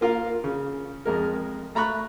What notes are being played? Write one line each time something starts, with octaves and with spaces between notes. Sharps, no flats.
A#3 F4 A#4 F5
C#3
F2 G#3 A#4
A3 A#5 B5 C#6 F#6